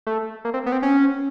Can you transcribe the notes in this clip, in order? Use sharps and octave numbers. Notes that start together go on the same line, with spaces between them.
A3
A#3
C4
B3
C4
C#4